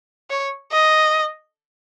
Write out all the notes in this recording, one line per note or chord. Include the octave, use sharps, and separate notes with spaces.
C#5
D#5